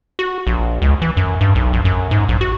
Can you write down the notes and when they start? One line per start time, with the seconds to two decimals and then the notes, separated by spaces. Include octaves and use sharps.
0.19 F#4
0.47 A#1
0.82 C#2
1.02 E3
1.17 F#2
1.41 G2
1.55 B1
1.73 A#1
1.85 F#2
2.11 G#2
2.29 A#1
2.41 F#4